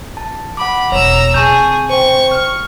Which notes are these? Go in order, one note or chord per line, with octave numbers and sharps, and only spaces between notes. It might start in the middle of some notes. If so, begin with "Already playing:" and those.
A5
F#5 B5 D6
E1 C#5 A#5 E6
C3 G#4 A5 C#6 G6
C5 G5 C#6
F6